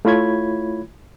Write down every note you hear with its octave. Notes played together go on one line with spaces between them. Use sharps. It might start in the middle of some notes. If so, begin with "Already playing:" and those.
A3 E4 F4 C#5 B5 G#6